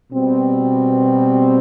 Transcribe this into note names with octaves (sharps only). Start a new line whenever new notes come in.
B2 G3 C4